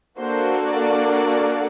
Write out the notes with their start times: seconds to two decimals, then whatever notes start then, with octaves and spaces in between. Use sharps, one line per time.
0.19 A#3 D4 F#4 A4 C5
0.67 D5